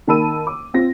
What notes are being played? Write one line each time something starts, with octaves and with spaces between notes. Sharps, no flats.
D#3 A#3 A5 B5 E6 D#7
D6
C4 F4 A#6